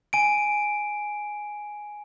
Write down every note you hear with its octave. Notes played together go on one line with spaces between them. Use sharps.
G#5 D7